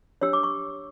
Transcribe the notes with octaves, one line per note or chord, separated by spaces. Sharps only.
D4 G4 C#5 E6
D6
C#6